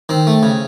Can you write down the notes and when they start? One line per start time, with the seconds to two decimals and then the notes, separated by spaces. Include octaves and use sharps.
0.09 D#3 C4
0.27 A3
0.43 C#3